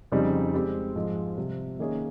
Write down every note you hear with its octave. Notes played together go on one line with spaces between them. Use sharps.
F2 C#3 G3 C4 D#4
G#3 C4 G4
G#2 F3 G#3
C3 G3 C4
D#3 A#3 C#4 G#4 C#5